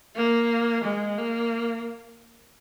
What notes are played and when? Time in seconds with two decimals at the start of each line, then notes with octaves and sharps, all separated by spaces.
0.16 A#3
0.84 G#3
1.18 A#3